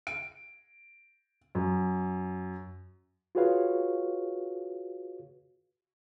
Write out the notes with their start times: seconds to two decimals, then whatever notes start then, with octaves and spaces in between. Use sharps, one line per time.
0.07 D7
1.55 F#2
3.35 F4 F#4 G#4 B4 C#5 F5